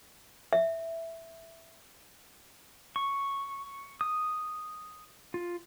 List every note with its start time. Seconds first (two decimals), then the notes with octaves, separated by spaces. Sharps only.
0.53 E5
2.96 C#6
4.01 D#6
5.34 F4